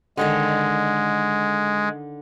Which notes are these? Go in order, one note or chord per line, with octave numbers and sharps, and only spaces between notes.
D3 D#3 G#3 A4